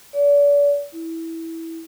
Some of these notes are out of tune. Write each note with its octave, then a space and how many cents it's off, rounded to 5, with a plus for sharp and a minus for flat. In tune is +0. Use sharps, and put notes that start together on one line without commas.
D5 -40
E4 -10